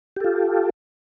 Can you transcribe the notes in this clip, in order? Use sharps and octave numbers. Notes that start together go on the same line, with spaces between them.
F4 G4 A4